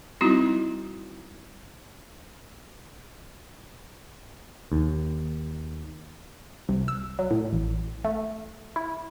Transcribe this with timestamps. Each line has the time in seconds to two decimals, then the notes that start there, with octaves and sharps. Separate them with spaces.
0.21 F#3 G3 C4 D#4 E4 F#4
4.72 D#2
6.69 C2
6.88 E6
7.19 F#3
7.31 A2
7.53 A1
8.05 A3
8.76 E4